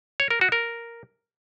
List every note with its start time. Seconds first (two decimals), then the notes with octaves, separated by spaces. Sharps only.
0.20 C#5
0.30 A#4
0.41 F#4
0.52 A#4